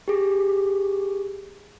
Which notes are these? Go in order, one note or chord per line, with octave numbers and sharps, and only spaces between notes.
G4 G#4